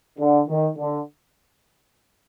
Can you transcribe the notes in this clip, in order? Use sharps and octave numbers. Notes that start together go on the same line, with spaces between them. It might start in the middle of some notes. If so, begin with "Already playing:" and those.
D3
D#3
D3